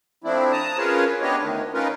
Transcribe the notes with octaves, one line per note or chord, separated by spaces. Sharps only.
F3 A3 C4 D4 E4
A5 A#5 D#6
C#4 F4 G#4 A#4 B4 C#5
B3 D4 G4 B4 C#5 D#5
D2 D#3
C#4 D#4 F4 A#4 B4